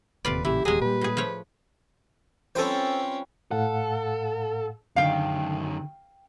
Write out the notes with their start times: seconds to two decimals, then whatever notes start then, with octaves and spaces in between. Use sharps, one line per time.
0.25 D1 D#2 A2 C3 F4 B4 D5
0.45 A1 A#2 C#3 E3 E4 G4
0.65 D#1 E2 F#3 G#3 G#4
0.81 A#2 G3 B4
1.01 A2 G#4
1.17 F3 A3 C#5
2.55 G3 C4 C#4 F4 A4 B4 C5
3.51 A2 A4 F5 F#5
4.96 F#2 D3 D#3 F5 G5